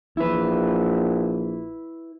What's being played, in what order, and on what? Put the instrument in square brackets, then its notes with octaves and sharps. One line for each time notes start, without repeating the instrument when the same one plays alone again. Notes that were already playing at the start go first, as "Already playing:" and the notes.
[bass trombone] A#1 [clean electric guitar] E4 B4